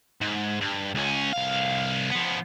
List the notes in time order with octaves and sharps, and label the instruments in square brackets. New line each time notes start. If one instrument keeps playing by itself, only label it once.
[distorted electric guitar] G#2
G2
C#2 C#4
C2 F5
F3 B3